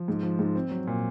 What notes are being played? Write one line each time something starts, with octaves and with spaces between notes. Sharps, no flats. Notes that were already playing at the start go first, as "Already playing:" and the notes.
Already playing: F3
G#2
F3
G#2
C4
F#3
A#2